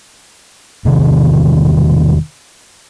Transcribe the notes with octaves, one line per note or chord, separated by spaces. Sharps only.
E1 C3 D#3